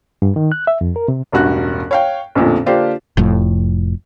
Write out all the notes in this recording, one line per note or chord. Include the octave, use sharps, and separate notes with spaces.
G2
D#3
F#6
E5
F2
A#4
C3
E1 A1 G2 F#4 F#6
C#5 F5 G5
A1 F2 A#2 D3
D3 A#3 D4 F4 G4 C5
F1 F2 A2